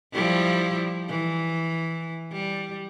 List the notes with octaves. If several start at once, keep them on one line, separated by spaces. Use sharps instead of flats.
F3 G3 E4
E3
G3